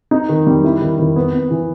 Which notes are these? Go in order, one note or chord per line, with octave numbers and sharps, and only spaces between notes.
D#4
D#3
G3
E4
D#3
D#3
B3
B3
E3